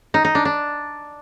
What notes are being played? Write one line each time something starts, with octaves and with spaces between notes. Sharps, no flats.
D#4
D#4
D4
D4